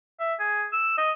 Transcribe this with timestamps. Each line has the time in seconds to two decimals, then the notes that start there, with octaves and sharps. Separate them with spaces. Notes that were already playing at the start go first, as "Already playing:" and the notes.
0.20 E5
0.40 G#4
0.73 E6
0.98 D#5